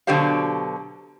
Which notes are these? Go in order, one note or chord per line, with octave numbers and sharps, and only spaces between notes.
B2 D3 F#3 G4 C5 F5